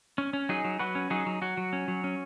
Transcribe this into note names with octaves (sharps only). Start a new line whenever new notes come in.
C#4
C#4
F#3 D#4 G#4
F#3
F#3 F#4 B4
C#4
F#3 D#4 G#4
F#3
F#3 F#4
F#3
C#4
F#3
C#4